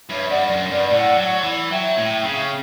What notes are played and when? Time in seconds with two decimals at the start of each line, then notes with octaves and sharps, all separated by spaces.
0.10 G2 C#5 E5
0.30 G2 D5 F#5
0.50 F#2
0.70 G2 D5 F#5
0.90 A2 D5 F#5
1.17 F#3
1.44 E3
1.71 F#3 E5 G5
1.98 A2
2.25 C#3